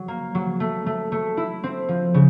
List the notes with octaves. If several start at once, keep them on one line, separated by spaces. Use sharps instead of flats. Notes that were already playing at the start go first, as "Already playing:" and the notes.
Already playing: F#3
A#3
F#3
A3
A3
A3
E4
C4
F3
C#3